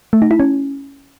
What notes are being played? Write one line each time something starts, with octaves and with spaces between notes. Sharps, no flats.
A3
D#4
E4
C#4